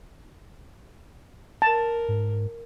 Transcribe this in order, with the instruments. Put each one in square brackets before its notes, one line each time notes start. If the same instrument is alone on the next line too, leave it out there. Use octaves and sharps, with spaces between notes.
[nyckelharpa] A#4 [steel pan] A5
[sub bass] G#2